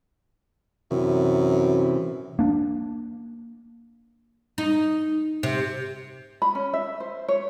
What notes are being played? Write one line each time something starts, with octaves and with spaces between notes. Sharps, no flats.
F#2 C3 E3
A#3 D4
D#4
C3
B5
C#4
E5
C5
C#5